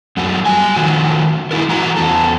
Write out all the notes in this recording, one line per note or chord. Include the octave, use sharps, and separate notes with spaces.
F#2 F#3 A3
G3 G#5
D#3 F3 F#3 A3 F#4
G#3 A#3 E4 A4 A#4
E3 A3 F#4 A#5
E2 A4